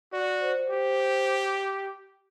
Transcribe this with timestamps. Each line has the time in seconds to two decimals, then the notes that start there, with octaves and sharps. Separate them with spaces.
0.12 F#4 D5
0.41 C5
0.70 G4 C5